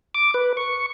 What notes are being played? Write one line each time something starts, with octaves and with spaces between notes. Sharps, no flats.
D6
B4
C#6